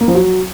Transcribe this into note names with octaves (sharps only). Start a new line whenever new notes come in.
A#3
F3
F#3